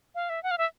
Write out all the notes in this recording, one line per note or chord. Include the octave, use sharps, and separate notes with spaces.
F5
E5
F#5
F5
E5